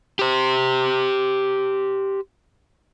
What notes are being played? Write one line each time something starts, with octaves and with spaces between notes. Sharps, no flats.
G4 C5